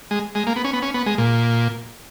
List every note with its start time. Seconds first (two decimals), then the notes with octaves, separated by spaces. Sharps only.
0.11 G#3
0.35 G#3
0.47 A#3
0.56 B3
0.64 C#4
0.73 B3
0.82 C#4
0.94 B3
1.06 G#3
1.18 A#2